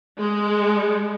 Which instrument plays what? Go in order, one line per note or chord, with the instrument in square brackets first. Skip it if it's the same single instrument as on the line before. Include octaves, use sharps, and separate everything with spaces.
[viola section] G#3